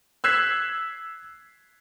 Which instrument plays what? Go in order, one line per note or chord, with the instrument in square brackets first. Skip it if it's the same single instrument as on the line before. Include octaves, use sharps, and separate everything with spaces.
[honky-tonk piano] E6 F#6 G#6 B6 C7 E7